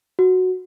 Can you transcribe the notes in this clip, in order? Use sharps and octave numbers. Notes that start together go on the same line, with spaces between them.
F#4